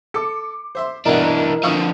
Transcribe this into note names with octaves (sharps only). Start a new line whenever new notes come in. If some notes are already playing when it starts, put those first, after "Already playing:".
A4 D6 C#7
C5 E5 C6
G2 B2 E3 D4 E4 A#4 D#5 F#5
D3 F3 F5 C#6 D#6